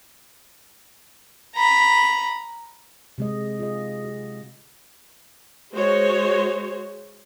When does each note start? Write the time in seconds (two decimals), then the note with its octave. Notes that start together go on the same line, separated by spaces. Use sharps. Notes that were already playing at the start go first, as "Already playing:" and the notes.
1.56 A#5 B5
3.18 C3 G#3 D#5
3.60 F4 G#4 D#5
4.05 F#4
5.73 G#3 F#4 C5 C#5